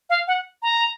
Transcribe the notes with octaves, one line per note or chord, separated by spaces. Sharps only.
F5
F#5
A#5